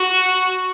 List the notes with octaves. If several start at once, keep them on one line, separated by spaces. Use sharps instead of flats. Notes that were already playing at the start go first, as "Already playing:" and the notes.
Already playing: F#4